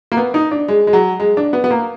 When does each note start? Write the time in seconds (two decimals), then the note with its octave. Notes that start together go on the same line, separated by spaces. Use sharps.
0.12 A#3
0.17 B3
0.34 D#4
0.51 D4
0.68 G#3
0.87 G#3
0.93 F#3
1.20 G#3
1.37 D4
1.53 B3
1.64 B3
1.71 A#3